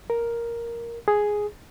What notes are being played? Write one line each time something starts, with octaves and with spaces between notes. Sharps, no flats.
A#4
G#4